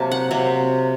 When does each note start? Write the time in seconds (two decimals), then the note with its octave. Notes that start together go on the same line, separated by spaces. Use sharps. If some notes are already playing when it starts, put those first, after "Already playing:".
Already playing: C3 F#3 A#3 A5
0.11 F#5
0.31 C3 F#3 A#3